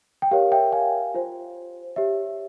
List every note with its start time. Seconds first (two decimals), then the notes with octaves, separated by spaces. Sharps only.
0.22 G5
0.31 G4 A#4 C#5 F5
0.52 E5 G5
0.72 F5 G#5
1.14 F4 C5
1.96 G4 C#5 E5